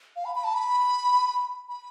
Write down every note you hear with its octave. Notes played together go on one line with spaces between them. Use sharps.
F5
B5
B5
A5
B5
B5